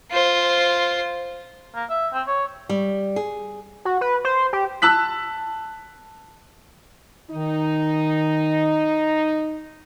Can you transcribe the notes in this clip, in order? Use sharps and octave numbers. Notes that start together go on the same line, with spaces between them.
F4 C5
A#3
E5
C4
C#5
G3
G#4
F#4
B4
C5
G4
A5 E6 F#6 B6
D#3 D#4